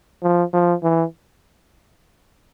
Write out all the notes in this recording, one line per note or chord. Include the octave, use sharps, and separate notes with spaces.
F3
F3
E3